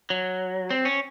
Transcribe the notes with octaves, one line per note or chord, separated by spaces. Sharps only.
F#3
C4
C#4